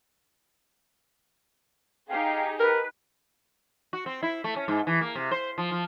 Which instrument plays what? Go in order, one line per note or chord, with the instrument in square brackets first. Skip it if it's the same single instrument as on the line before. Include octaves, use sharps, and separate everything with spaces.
[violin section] D#4 G4 G#4 [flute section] F5 G5
[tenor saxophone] A#4 [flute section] B4
[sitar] F#4
C4
E4
A3
C#4
G#2
E3
A#3
C3
C5
F3
F3